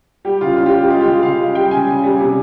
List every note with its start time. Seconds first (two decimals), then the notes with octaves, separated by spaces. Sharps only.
0.25 G3 G4
0.41 C#3 F4
0.57 C#3 F4
0.66 G4
0.74 G3
0.82 G4
0.90 G#3 F4
1.01 G4
1.06 C#3
1.23 C#3 F5
1.39 G#3
1.55 G3 G5
1.71 C#3 G#5
1.87 C#3
2.03 G3
2.20 C3